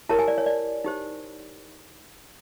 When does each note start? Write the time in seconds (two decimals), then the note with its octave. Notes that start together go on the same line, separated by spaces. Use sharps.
0.09 E4 G4 A#4 C#5 A5
0.19 G#5
0.28 D5
0.38 C#5
0.46 D5
0.84 D#4 G4 C5